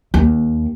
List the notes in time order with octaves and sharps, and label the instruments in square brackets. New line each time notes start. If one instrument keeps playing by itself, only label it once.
[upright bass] D#2